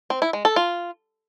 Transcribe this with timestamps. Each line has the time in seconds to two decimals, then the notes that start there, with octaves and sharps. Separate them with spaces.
0.10 C4
0.22 E4
0.33 G#3
0.45 A4
0.56 F4